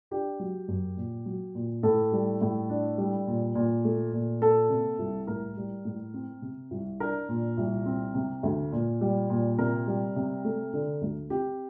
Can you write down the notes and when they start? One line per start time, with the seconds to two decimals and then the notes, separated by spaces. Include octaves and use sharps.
0.11 D4 G4
0.40 F#3
0.68 F#2
0.97 A#2
1.26 F#3
1.55 A#2
1.83 A2 A4
2.12 G3
2.41 A2
2.70 D4
2.98 G3
3.27 A#2
3.55 A#2
3.85 A3
4.13 A#2
4.41 A#3 A4
4.70 C3
4.99 C2
5.27 A2 A#4
5.57 G3
5.85 A2
6.14 C4
6.42 C3
6.71 C2
7.00 D4 A#4
7.29 A#2
7.58 C2
7.86 C4
8.15 C3
8.43 D2
8.72 A#2
9.01 G3
9.30 A#2
9.58 C3 A#4
9.87 G3
10.16 C3
10.45 A3
10.73 D3
11.02 D2
11.30 C4 G4